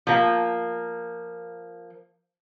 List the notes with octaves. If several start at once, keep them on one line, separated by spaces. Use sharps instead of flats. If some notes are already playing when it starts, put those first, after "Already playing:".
F3 A#3